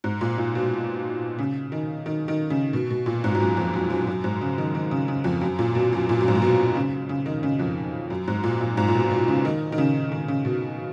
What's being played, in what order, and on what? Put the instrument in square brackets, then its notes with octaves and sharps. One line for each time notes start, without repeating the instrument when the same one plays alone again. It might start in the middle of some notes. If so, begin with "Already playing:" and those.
[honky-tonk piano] G#2
A#2
A#2
B2
C#3
D#3
D#3
D#3
C#3
B2
B2
A#2
G#2
G#2
F#2
F2
F#2
F#2
F#2
G#2
C#3
D#3
D#3
C#3
C#3
F2
F#2
A#2
B2
F#2
A#2
F#2
G#2
A#2
B2
C#3
C#3
D#3
C#3
F2
F#2
G#2
A#2
A#2
G#2
A#2
B2
B2
C#3
D#3
D#3
C#3
D#3
C#3
B2